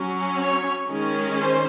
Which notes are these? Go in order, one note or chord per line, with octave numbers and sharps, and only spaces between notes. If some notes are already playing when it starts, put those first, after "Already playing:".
Already playing: F#3 C#4
C#5
D#3 G#3 C#4
C5